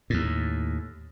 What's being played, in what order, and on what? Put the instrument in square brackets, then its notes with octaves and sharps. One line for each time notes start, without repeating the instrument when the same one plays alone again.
[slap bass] D#2 A2